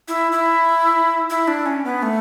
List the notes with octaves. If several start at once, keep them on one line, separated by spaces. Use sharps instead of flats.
E4
E4
E4
D4
C#4
B3
A3